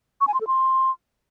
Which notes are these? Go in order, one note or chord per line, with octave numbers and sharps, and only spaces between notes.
C#6
G#5
C6
A4
C6